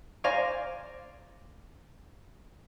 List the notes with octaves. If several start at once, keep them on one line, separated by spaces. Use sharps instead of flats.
C5 D5 F5 G#5 A#5